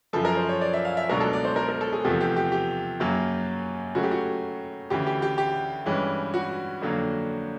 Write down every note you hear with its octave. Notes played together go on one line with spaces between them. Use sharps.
F#2 C#3 F3 A4
A#4
C5
C#5
D5
E5
F5
E5
C#2 B2 F#3 A3 D4 A#4
A4
D5
C5
A#4
A#4
A4
G#4
E2 C3 F3 A3 G4
G4
G4
G4
F#2 C#3 F#3 A#3
C#3 F#3 A3 F#4
G4
F#4
D2 C#3 E3 G4
G4
G4
G4
G2 E3 G#3 C#4
F#4
F2 D3 F#3 A#3